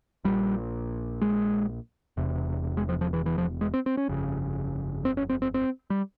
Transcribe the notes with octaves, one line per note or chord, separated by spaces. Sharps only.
A#1 A#2 G3
G#3
E1 E2 C3
G#3
F3
F3
E3
E3
F3
G#3
C4
C4
C#4
G1 F2 C#3
C4
C#4
C4
C4
C4
G3